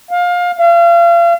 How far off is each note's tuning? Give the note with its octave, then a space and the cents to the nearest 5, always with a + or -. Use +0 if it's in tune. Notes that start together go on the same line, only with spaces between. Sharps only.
F5 +25
F5 -35